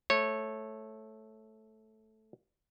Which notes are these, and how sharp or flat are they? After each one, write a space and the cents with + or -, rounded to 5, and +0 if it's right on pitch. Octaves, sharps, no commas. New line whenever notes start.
A3 -10 C#5 -20